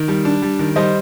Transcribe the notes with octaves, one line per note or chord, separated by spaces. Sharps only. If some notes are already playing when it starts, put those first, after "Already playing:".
Already playing: D#3
G3
D4
G3
D#3
G3 C5 D#5